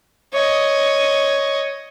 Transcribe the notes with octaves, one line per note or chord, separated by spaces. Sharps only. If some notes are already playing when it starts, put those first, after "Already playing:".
C#5 D#5